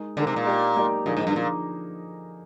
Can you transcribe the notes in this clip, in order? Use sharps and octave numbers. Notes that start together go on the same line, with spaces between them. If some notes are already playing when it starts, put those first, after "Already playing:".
Already playing: G#3 D#4 A#4
D3 G#3 D#4 A#4
C3
A#2
A#3 D#4 G4 D5
A#3 D#4 G4 D5
A#2 D3 F3 A#3 D#4 G#4
G#2
G2
A#2 D3 F3